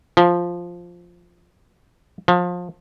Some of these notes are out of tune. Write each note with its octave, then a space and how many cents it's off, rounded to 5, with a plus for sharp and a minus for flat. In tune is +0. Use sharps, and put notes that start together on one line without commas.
F3 +0
F3 +25